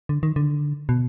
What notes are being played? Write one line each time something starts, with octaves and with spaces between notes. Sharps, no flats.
D3
D#3
D3
B2